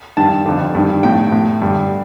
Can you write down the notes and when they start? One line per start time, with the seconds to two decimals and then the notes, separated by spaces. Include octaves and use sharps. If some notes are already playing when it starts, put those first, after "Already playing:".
0.17 G2 D#3 A5
0.46 F2 D3
0.75 G2 D#3
1.03 A2 G5
1.32 A2
1.62 G2 D3